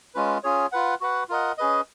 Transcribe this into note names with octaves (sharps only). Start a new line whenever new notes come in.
G#3 C#4 F4 B4
C#4 F4 G#4 C#5
F4 B4 F#5
F#4 B4 F#5
F4 A#4 D#5 F#5
C#4 G#4 B4 D#5